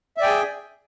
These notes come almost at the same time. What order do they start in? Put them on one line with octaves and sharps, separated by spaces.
E5 D5 G5 G#5 G#4